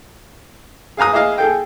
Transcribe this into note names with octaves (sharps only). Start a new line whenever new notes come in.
G#4 F5 G#5 A#5 D#6
E4 G#4 D#5 F5
G#4 A4 G5